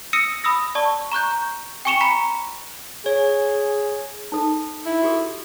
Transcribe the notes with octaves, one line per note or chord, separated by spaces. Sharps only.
D#6 E6 A#6 C#7 D#7 E7
B5 D#6 E6 A#6
D5 A5 C#6
A#5 C#6 F#6 G6
G5 G#5 C#6 C#7 E7 F7
A#5 B5 B6 C#7
G#4 C#5
D#4 A4
E4
F#4 G4 A4